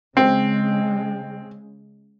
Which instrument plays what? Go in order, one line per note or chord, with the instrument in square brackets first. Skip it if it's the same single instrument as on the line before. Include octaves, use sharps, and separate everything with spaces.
[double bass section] C#3 G#3 [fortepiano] C4